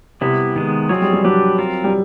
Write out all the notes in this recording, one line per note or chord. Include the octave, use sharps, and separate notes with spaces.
C3 G3 B3 E4
D#3 G#3 B3
F#3 G#3 C4 F4 G#4 C#5
G3
G3
F#3 D4 G4 B4
C4 F4 A#4
G3